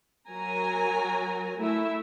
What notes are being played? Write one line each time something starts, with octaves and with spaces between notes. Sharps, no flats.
F#3 A#4 G#5 A#5
A3 E4 E5